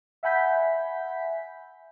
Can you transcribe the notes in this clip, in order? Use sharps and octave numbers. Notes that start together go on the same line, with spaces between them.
E5 F#5 G#5 B5 G6 B6